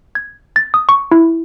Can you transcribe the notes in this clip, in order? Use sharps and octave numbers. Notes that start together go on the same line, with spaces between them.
G#6
A6
D#6
C#6
E4